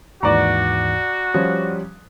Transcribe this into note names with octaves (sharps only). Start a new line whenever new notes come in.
D#2 G#2 E3 F#4 D5 A#5
F3 G3 C#4 D#6 F#6